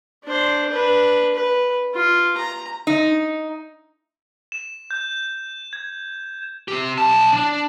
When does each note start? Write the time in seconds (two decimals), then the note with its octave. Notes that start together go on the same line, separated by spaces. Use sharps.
0.24 D4 C5
0.69 D4 B4
1.35 B4
1.94 F4
2.37 A#5
2.87 D#4
4.52 E7
4.91 G6
5.73 G#6
6.68 C4 G4
6.98 B1 A5
7.33 D4